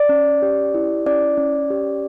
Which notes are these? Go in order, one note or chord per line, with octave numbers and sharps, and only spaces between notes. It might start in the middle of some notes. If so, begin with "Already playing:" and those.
Already playing: D5
C#4
G4
E4
C#4 D5
C#4
G4